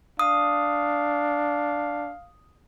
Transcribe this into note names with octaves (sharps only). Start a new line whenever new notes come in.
D4 F5 D#6